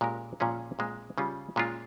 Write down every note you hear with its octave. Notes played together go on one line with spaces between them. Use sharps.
A#2 G#3 C#4 G4 A#4
A#2 F3 G#3 C#4 G#4
A#2 G#3 C4
C#3 G3 C#4 F4
A#2 G#3 C#4 F4